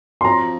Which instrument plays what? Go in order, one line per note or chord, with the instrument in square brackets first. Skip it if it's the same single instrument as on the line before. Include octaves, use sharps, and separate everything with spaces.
[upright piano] C6
[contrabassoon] F2 [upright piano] A#5